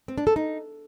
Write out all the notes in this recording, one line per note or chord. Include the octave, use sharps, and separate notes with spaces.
C4
D4
A4
D#4